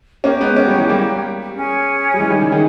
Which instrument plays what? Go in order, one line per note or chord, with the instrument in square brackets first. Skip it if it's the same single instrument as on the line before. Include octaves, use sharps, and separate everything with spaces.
[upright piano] A#3 C#4 [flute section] G4 C#5 G5
[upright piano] G#3 B3
A#3 C#4
G3
E3 G#3
G3 A#3
[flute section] C#4 G#4 C#5 G#5
[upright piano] G3
E3 G#3
D#3 G3
C#3 E3
D#3